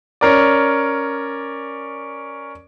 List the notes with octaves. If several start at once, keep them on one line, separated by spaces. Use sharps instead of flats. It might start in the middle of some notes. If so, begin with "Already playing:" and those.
C#4 A#4 D5